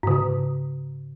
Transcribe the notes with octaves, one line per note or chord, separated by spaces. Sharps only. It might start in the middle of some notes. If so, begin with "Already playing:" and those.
G#2 C#3